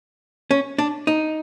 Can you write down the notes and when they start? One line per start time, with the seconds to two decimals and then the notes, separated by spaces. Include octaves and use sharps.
0.51 C#4
0.79 D4
1.07 D#4